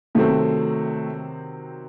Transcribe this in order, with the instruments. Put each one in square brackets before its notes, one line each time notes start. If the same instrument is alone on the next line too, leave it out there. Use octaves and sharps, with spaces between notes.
[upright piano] C3 D#3 F#3 C4 [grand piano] A3